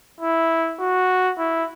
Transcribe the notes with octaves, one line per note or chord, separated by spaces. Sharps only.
E4
F#4
E4